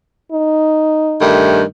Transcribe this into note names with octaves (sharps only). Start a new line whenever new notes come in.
D#4
G2 D#3 A3